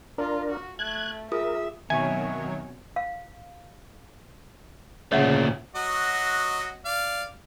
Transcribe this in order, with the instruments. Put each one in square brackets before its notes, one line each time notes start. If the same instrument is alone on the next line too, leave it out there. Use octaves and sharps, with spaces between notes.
[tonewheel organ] D4 A#4 [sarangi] F4
[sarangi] F#4
[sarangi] A3 [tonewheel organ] F#6 G#6
[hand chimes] F4 G#4 D#6 [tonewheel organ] A#4 [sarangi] E5
[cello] B2 C4 [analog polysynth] D#3 F#3 C#5 [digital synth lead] E5 [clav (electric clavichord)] G#5
[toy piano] F5
[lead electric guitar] D2 A#2 [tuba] C#3 [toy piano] C#5 E5 F#5
[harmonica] F#3 F#4 D#5
D5 F5